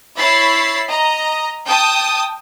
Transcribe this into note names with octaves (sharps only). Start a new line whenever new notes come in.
E4 C#5 E5 B5 A6 C7
D#5 A#5
G5 A5 D#6